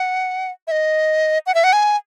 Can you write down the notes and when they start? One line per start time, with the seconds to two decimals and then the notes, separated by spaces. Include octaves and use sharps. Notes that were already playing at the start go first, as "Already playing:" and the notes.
Already playing: F#5
0.67 E5
0.71 D#5
1.46 F#5
1.54 E5
1.64 F#5
1.73 G#5